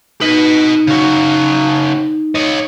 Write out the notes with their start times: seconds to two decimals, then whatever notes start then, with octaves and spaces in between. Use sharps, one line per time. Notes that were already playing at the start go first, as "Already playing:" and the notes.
0.21 D#4 B4 D#5
0.87 C#3 F#4
2.35 C#5 D#5